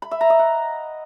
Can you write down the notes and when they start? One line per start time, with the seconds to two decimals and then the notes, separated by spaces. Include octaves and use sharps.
0.02 B5
0.11 E5
0.21 A#5
0.30 D#5
0.39 F#5